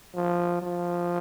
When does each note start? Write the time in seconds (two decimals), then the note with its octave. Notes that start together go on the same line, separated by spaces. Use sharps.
0.15 F3
0.62 F3